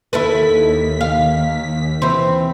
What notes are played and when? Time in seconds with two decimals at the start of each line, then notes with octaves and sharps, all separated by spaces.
0.13 D#2 E4 A4 B4 B6
1.01 F5
2.02 E3 C4